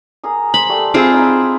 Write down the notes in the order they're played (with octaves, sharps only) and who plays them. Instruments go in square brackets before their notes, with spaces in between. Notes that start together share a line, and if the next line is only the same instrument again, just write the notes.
[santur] G#4 A#4 D#6
[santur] C5 [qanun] B5
[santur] G3 A3 D5
[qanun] C4 F4 G#4 [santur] E5 G#5 B5
[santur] D#4 E4